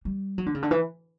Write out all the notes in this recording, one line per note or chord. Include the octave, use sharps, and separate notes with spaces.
G3
F#3
D3
C#3
D3
E3